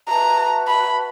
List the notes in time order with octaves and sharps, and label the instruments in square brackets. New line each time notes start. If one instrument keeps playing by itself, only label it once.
[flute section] F#4 B4 E5 A5 [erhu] A#5
[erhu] B5